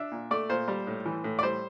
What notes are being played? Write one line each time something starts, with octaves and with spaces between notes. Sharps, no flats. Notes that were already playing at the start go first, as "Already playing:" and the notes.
Already playing: D4 E5
A#2
A3 D5
A#2 C5
G3
A2
E3
A2
D5
G3 C5